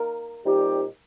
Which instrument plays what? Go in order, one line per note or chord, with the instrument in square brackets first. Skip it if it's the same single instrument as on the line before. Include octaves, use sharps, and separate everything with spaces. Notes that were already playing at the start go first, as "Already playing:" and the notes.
Already playing: [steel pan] A#4
[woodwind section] A#2 G3 C4 D#4 G4